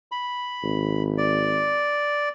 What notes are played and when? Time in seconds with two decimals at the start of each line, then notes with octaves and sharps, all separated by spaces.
0.12 B5
0.63 G#1
1.18 D5